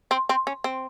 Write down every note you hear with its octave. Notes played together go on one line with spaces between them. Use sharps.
C4
C4
C#4
C4